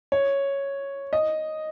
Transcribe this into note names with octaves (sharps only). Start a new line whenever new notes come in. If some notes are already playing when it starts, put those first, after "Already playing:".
C#5
D#5